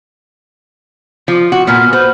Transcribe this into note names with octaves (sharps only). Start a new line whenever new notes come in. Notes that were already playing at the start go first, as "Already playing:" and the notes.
F3 F4
F#4
A#2 B3 F6
B4 C5